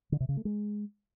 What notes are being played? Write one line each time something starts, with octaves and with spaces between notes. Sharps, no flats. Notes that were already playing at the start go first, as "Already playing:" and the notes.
D3
C3
C#3
A3
G#3